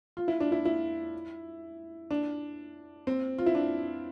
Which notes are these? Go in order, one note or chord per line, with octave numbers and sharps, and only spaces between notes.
F4
E4
D4
E4
E4
D4
C4
F4
E4
D4